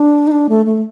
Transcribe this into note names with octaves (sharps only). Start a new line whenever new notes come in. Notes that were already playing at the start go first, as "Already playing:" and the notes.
Already playing: D4
D#4
D4
A3
A3